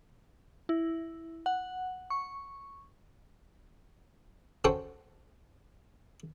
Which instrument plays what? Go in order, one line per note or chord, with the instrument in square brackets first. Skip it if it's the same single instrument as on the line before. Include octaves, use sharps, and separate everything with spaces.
[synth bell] E4
F#5
C#6
[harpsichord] C#4 F#4 A4 C5 F#5 G5